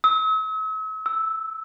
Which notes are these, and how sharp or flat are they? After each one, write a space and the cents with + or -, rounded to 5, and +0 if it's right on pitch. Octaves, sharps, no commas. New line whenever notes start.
E6 -45
E6 -5